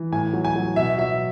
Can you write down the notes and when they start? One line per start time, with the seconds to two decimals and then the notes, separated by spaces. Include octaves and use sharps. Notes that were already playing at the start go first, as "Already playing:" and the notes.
Already playing: E3
0.12 A2 G#5
0.33 F#3
0.45 G#5
0.56 F#3
0.76 B2 E5
0.98 F#3 E5